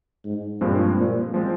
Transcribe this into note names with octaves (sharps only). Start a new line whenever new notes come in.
G#2
G2 A#2 F3 G#3 C4
A#2
F3 G#3 C4